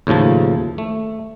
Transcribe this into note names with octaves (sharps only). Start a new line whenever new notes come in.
D#2 A2 C#3 F3 A5
A3